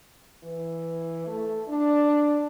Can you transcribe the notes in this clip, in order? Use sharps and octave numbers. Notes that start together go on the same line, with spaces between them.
E3
A3
D4